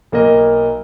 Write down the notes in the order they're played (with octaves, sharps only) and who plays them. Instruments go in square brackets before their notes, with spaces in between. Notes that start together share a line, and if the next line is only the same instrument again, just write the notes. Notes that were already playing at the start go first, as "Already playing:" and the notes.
[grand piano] B1 A#3 A#4 D#5